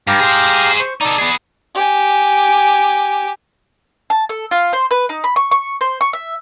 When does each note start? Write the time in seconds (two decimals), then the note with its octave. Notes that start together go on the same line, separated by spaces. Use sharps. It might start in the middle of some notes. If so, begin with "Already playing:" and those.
0.07 G2 G4 F5 A#5
0.20 G#4 C5
0.80 C5 C#6
1.01 D#4 A4 D5
1.18 B3 G#4
1.75 G4 G#5
4.10 A5
4.29 A4
4.51 F4
4.73 C5
4.91 B4
5.09 D#4
5.24 B5
5.36 C#6
5.52 C#6
5.81 C5
6.01 C#6
6.13 E5